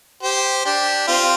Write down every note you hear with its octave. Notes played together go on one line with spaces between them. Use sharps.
G4 C5
D4 G4
C4 F4